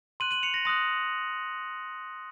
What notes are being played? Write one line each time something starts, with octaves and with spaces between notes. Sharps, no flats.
C6 F#6 D#7 F#7
D#7 F#7
C#7 F7
A#6
C6 D#6 F#6 A#6